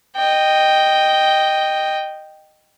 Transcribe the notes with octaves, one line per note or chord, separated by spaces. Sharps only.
D#5 G5